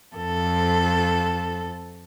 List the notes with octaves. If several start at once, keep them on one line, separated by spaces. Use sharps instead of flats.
F2 A4